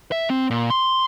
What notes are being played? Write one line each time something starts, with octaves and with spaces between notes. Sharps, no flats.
E5
C4
A#2
C6